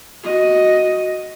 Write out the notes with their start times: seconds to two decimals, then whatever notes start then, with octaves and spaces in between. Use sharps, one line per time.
0.24 F#4 D#5